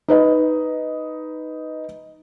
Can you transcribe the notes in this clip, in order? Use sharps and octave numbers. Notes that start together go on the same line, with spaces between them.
D#4 B4 D#5